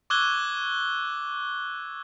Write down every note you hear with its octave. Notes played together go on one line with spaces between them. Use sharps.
C#6 D6 E6 F#6 G#6 G7